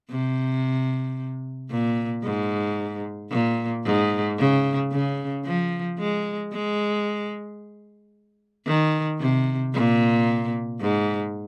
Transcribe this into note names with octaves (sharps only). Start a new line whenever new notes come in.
C3
A#2
G#2
A#2
G#2
C#3
C#3
F3
G#3
G#3
D#3
C3
A#2
G#2